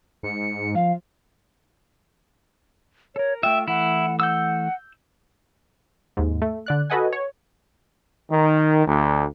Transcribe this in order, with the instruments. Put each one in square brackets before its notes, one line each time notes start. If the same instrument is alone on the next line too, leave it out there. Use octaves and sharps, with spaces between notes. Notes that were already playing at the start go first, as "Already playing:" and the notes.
[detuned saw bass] G#2 [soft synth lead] C#7
[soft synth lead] F3 [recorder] F5
[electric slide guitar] A4 A#4 [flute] C#5
[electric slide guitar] A3 F4 [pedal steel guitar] E5 [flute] G5
[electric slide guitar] E3 A3 [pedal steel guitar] E4 [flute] F#5
[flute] F#5 [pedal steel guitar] E6 G6
[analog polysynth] D#2 G#2
A3
D3 D5 F#6
F#4 A4 B4 D#5 F#5 G#5
C#5
[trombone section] D#3
D2